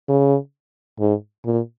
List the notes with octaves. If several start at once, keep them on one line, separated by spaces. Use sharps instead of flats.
C#3
G#2
A#2